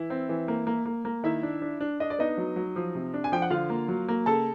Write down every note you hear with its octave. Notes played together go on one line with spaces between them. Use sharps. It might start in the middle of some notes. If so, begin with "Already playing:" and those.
Already playing: E3 E4
C4
E3
A#3
A#3
A#3
A#3
D#3 E4 E5
D4
D4
D4
D4 D#5
D5
B3 D#4 D#5
F#3
F#3
F3
C3
D4
G#5
F3 G5
F#5
D3 F4 F5
A#3
F#3
A#3
C#3 A4 A5